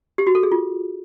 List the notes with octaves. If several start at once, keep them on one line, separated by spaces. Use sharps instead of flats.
G4
F#4
A4
G#4
F4